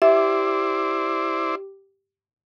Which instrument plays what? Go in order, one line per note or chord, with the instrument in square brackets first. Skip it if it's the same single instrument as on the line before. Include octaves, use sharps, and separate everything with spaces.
[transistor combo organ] E4 C5 D5 [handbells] G4 [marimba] E5